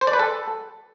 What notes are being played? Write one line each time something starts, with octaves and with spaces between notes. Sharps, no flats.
C5
D5
B4
A4